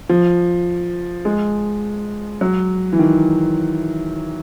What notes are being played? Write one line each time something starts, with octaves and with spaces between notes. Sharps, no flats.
F3
G#3
F#3
E3
D#3